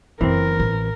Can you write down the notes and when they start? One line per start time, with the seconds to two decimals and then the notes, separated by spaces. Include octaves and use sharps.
0.21 F#1 E3 C4 A#4
0.59 A1